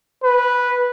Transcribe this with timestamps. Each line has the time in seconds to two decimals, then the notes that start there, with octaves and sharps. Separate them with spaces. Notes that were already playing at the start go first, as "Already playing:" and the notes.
0.23 B4